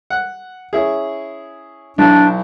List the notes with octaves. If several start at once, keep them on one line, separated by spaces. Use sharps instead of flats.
F#5
C#4 E4 G#4
B1 E3 D4